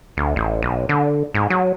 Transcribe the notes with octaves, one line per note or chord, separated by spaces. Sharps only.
D2
A1
B1
D3
G#2
F#3